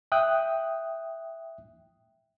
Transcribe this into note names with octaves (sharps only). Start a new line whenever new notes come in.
E5 G5 D#6 F#6